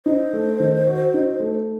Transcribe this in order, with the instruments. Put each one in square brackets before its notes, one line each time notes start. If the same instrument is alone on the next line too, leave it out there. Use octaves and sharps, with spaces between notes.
[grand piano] D#4 [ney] C5
[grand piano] A3
D#3
F#4
D#4
A3